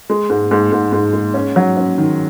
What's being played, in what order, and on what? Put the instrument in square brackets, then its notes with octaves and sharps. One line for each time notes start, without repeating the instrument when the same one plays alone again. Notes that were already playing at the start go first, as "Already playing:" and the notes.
[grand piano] G#3
G#2
G#2
G#2
G#2
G#3
C#4
F#3
C#4
D#3